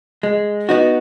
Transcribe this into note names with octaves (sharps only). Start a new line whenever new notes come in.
G#3
B3 D#4 F#4